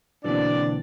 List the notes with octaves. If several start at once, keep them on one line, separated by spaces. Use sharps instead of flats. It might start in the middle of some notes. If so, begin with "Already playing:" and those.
B2 D3 E3 F#3 A#3 C4 D4 D5